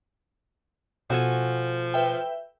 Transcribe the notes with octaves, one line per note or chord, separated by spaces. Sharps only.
B2 F3 F#4 A4 G#5
B4 E5 G5